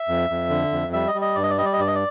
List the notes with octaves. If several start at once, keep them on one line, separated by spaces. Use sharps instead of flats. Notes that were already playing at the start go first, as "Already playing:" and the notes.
Already playing: E5
F2
F2
D3
F2
G3 E5
D#5
G3
D#5
G2 D5
D#5
D5
G3 D#5
D5
D#5
G2 D5
D#5
D5